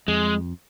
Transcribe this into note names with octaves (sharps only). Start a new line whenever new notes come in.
F2 G#3